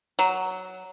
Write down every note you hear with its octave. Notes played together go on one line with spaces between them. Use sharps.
F#3